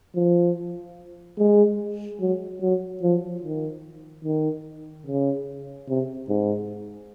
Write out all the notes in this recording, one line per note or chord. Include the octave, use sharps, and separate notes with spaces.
F3
G#3
F#3
F#3
F3
D#3
D#3
C#3
C3
G#2